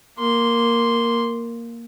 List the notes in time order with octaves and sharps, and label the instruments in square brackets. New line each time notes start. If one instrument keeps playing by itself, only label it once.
[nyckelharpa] A#3 C6